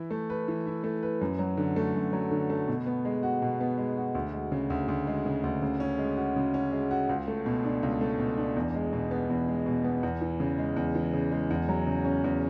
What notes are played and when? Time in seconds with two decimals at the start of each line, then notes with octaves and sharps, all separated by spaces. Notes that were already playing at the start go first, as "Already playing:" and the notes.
Already playing: E3 E4
0.11 A3
0.30 B4
0.48 E3
0.66 E4
0.84 A3
1.03 B4
1.21 F#2
1.39 F#3
1.57 D3
1.76 A3
1.94 F#2
2.13 F#3
2.31 D3
2.50 A3
2.67 B2
2.86 B3
3.05 G#3
3.23 F#4
3.42 B2
3.60 B3
3.78 G#3
3.97 F#4
4.15 D2
4.33 G#3
4.52 C#3
4.70 D2
4.88 D2
5.07 G#3
5.26 C#3
5.44 D2
5.62 C#3
5.80 C#4
5.98 G#3
6.17 F#4
6.36 C#3
6.54 C#4
6.72 G#3
6.91 F#4
7.09 C#2
7.28 A3
7.46 B2
7.65 D4
7.83 C#2
8.01 A3
8.19 B2
8.38 D4
8.56 E2
8.74 G#3
8.93 B2
9.11 B3
9.30 E2
9.48 G#3
9.66 B2
9.84 B3
10.03 E2
10.21 E3
10.40 C#3
10.58 G#3
10.76 E2
10.95 E3
11.13 C#3
11.32 G#3
11.50 E2
11.69 F#3
11.87 C#3
12.05 C#4
12.24 E2